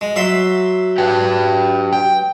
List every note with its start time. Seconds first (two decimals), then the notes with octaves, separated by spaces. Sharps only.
0.01 G#3
0.16 F#3 E5 C6
0.98 G4 B4 G5
1.93 G5